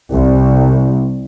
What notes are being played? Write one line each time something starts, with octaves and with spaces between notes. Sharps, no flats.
C2